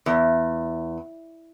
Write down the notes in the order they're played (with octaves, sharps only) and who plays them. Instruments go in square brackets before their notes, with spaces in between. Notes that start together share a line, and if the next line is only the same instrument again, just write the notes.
[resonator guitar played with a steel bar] E2